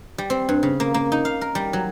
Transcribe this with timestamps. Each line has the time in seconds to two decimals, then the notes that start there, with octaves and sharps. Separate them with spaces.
0.18 G3
0.30 C4
0.49 G2
0.63 C#3
0.80 A#3
0.94 A#3
1.12 D#4
1.25 F5
1.41 A#4
1.55 G3
1.73 F#3